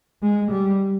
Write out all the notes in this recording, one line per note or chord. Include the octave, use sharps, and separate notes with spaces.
G#3
G3